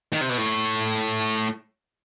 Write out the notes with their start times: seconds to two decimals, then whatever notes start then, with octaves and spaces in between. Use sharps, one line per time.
0.13 D#3
0.21 C3
0.29 B2
0.38 A2